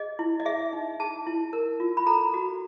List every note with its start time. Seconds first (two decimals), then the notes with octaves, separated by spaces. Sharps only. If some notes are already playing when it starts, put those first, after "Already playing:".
Already playing: G#4 D#5
0.19 E4
0.40 D#5
0.45 G#4 E5
0.73 D#4
1.00 G#4 A5
1.27 E4
1.53 A#4
1.80 F4
1.97 B5
2.06 A4 A#5
2.34 F#4